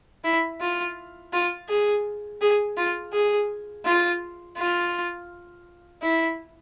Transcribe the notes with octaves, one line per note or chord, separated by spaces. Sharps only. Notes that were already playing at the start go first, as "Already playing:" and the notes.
E4
F4
F4
G#4
G#4
F4
G#4
F4
F4
E4